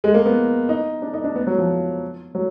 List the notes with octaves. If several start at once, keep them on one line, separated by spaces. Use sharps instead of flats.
G#3
A#3
B3
D#4
D4
D#4
D4
B3
F#3
F3
F#3